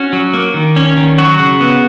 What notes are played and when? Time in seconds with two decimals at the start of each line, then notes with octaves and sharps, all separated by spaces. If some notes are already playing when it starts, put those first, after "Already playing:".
Already playing: C#4 F#4
0.13 F#3
0.34 A#3
0.54 D#3
0.76 C#4
0.97 D#3
1.18 F#3 F#4
1.39 C#3
1.61 B3